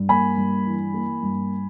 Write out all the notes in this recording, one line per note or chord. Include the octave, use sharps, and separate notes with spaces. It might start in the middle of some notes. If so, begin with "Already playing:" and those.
Already playing: G2
A#3 G#5 B5
G2
E3
A#3
G2